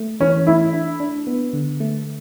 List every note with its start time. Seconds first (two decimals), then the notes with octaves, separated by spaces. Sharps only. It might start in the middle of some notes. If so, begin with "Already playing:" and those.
Already playing: A3
0.20 E3 C#4
0.46 A3 E4
0.73 D4
1.00 D4
1.27 B3
1.53 D3
1.80 A3